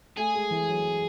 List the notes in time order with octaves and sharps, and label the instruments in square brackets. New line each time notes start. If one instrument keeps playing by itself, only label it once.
[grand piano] A3 [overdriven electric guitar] G#4
[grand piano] G#3
E3
F#3